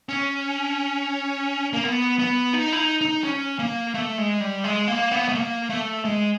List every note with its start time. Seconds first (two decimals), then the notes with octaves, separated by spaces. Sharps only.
0.09 C#4
1.73 A#3
1.84 B3
2.19 B3
2.53 D#4
2.72 E4
2.77 D#4
3.01 D#4
3.24 C#4
3.59 A#3
3.94 A3
4.18 G#3
4.40 G3
4.64 G#3
4.88 A#3
5.12 B3
5.28 A3
5.35 A#3
5.70 A3
6.05 G#3